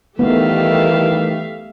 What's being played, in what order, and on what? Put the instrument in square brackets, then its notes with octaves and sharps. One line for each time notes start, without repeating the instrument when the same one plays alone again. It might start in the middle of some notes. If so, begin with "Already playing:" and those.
[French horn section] D#3 E3 [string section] G3 A3 G4 [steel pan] B3 [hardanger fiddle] E5 F5